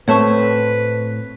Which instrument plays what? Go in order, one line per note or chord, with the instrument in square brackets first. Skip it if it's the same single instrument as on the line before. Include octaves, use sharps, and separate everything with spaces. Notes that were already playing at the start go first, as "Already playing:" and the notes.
[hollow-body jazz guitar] A2 A3 C4 [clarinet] B4 [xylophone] C#5 A5 C#6